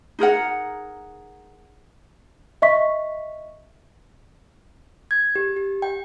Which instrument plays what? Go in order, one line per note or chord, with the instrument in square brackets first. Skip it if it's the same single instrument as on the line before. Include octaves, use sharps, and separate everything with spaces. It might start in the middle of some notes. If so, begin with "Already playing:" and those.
[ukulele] D#4 G#4 A#4 F#5
[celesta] D#5 E5 C#6 B6
[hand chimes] G#6
G4
G4
G5